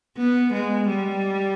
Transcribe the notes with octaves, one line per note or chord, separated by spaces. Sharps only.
B3
G#3
G3